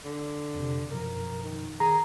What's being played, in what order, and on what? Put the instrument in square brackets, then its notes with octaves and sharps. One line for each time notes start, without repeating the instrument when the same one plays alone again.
[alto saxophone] D3
[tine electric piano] F2 C3
[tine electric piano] F#2 B2 F3 [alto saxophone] A#4
[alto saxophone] D#3
[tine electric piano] D#3 A#4 [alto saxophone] G#4 [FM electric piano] A#5